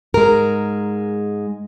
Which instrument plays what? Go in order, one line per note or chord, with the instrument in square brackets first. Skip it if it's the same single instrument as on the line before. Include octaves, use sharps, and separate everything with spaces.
[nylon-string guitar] G#2 G#3 A#4